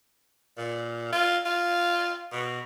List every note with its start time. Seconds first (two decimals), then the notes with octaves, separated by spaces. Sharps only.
0.57 A#2
1.13 F4
1.45 F4
2.32 B2